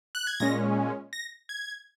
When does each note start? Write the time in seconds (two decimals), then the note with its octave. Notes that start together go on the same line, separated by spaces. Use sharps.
0.15 F#6
0.27 G#6
0.40 A#2 G#3 C#4 A#6
1.13 A#6
1.49 G#6